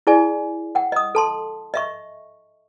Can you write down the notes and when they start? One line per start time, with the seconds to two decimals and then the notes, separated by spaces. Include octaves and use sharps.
0.07 E4 G#4 D5 G#5
0.75 F#5 G5
0.92 D#5 D#6
1.15 A4 A5 C6
1.74 D#5 E5 C#6